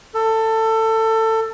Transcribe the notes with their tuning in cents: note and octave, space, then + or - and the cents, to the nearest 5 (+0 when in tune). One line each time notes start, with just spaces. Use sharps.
A4 +20